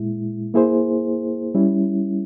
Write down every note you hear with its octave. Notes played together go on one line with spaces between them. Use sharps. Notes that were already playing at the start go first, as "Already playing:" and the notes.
Already playing: A#2 G#3 E4
A#3 E4 G#4 C5
G3 C#4 E4